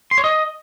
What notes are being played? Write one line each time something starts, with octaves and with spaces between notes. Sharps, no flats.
C6
C#5
D#5